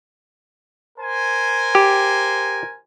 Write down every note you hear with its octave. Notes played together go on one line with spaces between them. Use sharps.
A#4 C5 G#5
G4